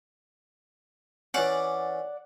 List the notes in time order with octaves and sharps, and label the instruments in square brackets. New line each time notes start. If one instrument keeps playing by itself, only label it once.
[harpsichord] E3 C#4 [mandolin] D5 F#5